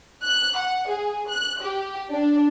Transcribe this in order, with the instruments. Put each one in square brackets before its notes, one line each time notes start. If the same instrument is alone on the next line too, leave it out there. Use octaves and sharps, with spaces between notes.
[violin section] F#6
F#5
G#4
F#6
G4
D4